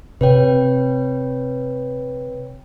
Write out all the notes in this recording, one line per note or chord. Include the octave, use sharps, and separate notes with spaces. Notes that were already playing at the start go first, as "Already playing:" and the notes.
C3 B4 C#5 G5